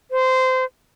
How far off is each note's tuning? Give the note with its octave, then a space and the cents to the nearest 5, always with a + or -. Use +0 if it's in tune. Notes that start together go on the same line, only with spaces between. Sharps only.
C5 -20